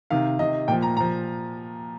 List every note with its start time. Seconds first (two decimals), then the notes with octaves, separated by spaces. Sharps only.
0.10 C3 D#3 F5
0.39 C3 D#3 D#5
0.68 A#2 F3 G5
0.82 A#5
0.97 A#2 F3 A#5